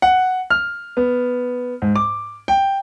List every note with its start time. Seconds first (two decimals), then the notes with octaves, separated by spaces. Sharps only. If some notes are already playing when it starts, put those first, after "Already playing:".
0.02 F#5
0.50 F6
0.97 B3
1.82 G#2
1.96 D6
2.48 G5